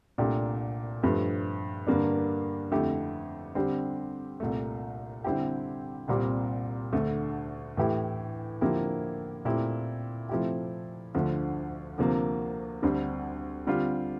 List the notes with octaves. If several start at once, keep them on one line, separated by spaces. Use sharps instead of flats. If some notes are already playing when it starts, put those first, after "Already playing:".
C2 A#2 A3 D4 G4
G2 F3 A3
G2 D3 G3 A#3 D4
F2 D3 A3 E4 G4
D3 G3 C4 G4
C2 A#2 A3
D3 G3 C4 E4 G4
C2 A#2 G3 C4 G4
D2 D3 A3
A2 E3 A3 E4 G4
D3 F3 A#3 E4 G4
A#2 A3 C4 E4 G4
C3 F3 A3 E4 G4
D2 D3 F3 A3
D2 C3 F3 A#3
D2 D3 G3 C4
D3 G3 C4 F4